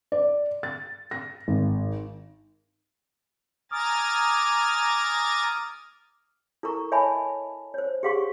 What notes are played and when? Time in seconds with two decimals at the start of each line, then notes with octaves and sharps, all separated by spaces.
0.12 D5
0.63 A6
1.11 A#6
1.48 G#1
3.72 G#5 A#5 D6 D#6 F6 A6
6.63 E4 A4 A#4 A#5 C#6
6.92 C#5 D#5 E5 G#5 A5 B5
7.74 C5 C#5
8.03 G4 G#4 F5 F#5 C6 C#6